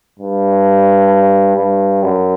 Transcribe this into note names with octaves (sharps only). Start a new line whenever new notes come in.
G2
G2
F#2